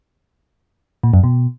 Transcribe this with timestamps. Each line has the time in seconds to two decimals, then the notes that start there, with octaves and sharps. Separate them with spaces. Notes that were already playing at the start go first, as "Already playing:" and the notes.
1.03 A#2
1.13 F#2
1.24 B2